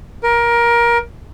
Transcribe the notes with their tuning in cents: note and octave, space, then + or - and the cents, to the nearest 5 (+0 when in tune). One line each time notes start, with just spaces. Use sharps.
A#4 +20